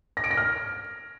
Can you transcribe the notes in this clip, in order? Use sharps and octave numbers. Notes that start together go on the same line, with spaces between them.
A#6
D7
A#6
F6